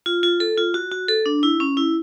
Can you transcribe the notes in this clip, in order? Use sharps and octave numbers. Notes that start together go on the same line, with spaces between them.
F4
F4
A4
F4
F#4
F#4
A4
D4
E4
C#4
E4